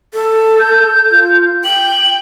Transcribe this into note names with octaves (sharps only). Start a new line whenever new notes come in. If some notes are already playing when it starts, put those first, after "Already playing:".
A4
G6
F4
G5 F#7